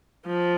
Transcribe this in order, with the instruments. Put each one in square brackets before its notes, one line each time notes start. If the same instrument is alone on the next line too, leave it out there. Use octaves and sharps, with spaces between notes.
[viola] F3